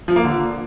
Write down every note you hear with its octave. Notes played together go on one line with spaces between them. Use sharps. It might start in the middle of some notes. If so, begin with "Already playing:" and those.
F3
A#3
D3